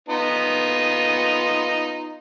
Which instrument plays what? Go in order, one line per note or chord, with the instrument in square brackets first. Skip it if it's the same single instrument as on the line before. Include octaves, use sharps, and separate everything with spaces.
[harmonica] B3 D#4 F4